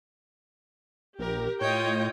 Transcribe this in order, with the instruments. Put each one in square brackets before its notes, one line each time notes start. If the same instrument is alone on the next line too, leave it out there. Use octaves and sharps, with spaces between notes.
[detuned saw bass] A#1 [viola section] G4 A#4
[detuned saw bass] A2 [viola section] F4 D#5 G5 [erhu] C#5